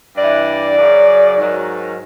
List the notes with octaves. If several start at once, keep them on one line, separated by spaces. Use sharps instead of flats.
G2 E3 D5
F#2 C#3 F#3
G#2 D#3 F#3